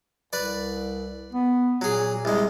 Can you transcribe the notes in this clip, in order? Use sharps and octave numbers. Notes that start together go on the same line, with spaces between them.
C2 B4 D5
B3
A#2 F#3 G#4
C2 G#3